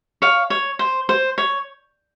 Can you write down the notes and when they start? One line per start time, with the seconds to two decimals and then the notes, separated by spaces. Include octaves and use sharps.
0.22 C#5 F5
0.50 C#5
0.79 C5
1.09 C5
1.38 C#5